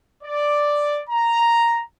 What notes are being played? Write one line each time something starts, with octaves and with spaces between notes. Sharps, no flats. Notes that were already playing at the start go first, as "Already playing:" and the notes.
D5
A#5